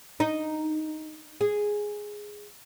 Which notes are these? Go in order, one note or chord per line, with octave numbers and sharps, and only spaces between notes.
D#4
G#4